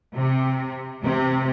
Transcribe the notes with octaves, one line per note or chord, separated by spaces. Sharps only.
C3
C3